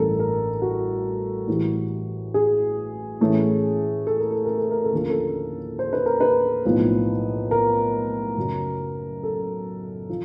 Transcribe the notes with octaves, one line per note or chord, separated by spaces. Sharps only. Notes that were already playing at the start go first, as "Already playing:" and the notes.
Already playing: A1 G2 E3 A4 A#4
A#4
F#4
A2 E3 G3
G#4
A2 E3 A3 C#4
A4
A#4
A4
A#4
A4
A#4
A4
D#2 D3 F3 A#3 C#4 A#4
A4
C5
B4
A#4
B4
B1 A2 F3 A#3 D#4
A#4
F#2 C#3 F#3
A4
F3